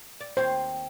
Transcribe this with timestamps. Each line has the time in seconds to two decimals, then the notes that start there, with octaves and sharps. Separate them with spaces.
0.21 D5
0.37 D#2 C4 C5 C#5